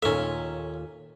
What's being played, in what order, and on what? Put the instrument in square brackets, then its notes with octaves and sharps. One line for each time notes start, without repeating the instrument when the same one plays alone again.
[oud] D#2 A#2 [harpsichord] C#4 E5 [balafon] D#4 A4